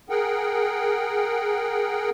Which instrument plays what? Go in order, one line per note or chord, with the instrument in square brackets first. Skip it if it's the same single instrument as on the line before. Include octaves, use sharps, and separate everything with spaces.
[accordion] G#4 A#4 F#5 G5